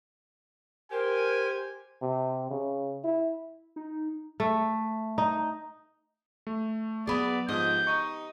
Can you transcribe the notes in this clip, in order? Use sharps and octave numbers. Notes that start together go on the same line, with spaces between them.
G4 A#4 C5 G#5
C3
C#3
E4
D#4
A3
D#4
A3
F#3 B3 G#4 D5 B5 D#6
G#2 F3 G4 D#5 G6
D#4 C#6